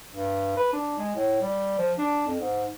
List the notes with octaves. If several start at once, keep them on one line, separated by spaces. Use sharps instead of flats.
G2
B4
D4
G#3
A2
G3
F3
D4
F2
G#2